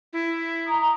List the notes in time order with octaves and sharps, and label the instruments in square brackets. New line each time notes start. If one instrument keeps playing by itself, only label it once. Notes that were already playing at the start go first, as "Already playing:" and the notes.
[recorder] E4
[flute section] A#5 D#6